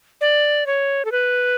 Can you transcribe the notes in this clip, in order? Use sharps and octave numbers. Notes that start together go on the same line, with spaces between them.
D5
C#5
A4
B4